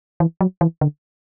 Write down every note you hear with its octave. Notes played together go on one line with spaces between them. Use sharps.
E3
F#3
E3
D3